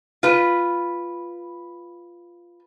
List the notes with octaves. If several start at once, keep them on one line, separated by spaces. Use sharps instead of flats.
F4 B4